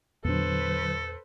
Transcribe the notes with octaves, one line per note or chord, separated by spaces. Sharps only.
E2 A#2 D3 F#3 D4 A4 B4 C5